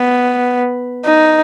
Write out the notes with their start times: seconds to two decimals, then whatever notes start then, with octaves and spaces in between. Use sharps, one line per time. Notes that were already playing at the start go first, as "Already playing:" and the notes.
Already playing: B3
1.05 D#4